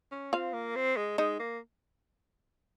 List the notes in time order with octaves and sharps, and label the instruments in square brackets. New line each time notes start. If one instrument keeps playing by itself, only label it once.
[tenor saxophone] C#4
[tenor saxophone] C4 [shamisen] F4 F5
[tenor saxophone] A#3
C4
G#3
[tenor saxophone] G#3 [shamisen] D#4 D#5
[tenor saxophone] A#3